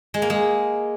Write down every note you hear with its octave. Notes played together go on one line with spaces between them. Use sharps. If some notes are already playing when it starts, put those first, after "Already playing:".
G#3
A#3
G#3